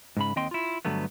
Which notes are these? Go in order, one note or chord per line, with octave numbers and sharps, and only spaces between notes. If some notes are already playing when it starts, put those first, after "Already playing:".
G#2 C#3 B5
D#2 C4 D#5 G5 C6
E4 F4
G2 D3 F#3 A3 B3